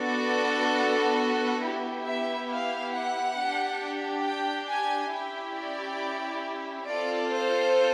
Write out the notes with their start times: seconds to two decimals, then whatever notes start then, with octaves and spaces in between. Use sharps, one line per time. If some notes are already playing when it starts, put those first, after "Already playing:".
Already playing: B3 D4 F#4 A4 D5
1.63 B3 E4 G4
2.06 E5
2.50 F5
2.94 F#5
3.38 D4 G4
4.25 G5
4.68 G#5
5.12 C#4 E4 G4 G5
5.56 D5
6.86 C4 F4 A4 D5
7.30 C5